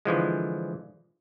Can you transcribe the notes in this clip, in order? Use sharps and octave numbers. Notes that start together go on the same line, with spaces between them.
D3 E3 F3 G#3